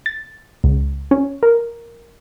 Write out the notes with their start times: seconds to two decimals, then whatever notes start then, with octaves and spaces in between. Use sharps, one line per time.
0.06 A6
0.64 C#2
1.11 C#4
1.43 A#4